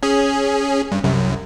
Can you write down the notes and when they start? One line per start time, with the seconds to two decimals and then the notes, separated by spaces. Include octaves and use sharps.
0.03 C#4 G#4
0.92 G2
1.04 C2 F#2